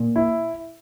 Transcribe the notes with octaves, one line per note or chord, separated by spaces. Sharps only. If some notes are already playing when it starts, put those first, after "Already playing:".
Already playing: A#2
E4